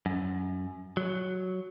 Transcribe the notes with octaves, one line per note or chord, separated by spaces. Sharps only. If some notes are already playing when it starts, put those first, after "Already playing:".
F#2
F#3